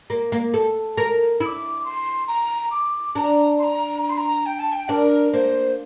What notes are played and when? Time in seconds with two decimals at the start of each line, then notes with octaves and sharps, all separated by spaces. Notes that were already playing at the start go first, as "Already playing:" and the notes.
0.10 A#3
0.32 A#3
0.54 A4
0.98 A#4
1.40 E4 E6
1.46 D6
1.84 C6
2.28 A#5
2.71 D6
3.15 D4 A#5
3.59 C6
3.64 A#5
4.03 A#5
4.10 C6
4.17 A#5
4.46 G5
4.59 A5
4.72 G5
4.89 D4 A#4
5.33 A#3 C5